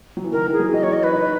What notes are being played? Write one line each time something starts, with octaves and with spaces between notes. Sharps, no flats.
F#3
E3
D#3 A#4
E3
G#4
F#3
E3
F#3 D#5
C#5
D#5
B4
D#4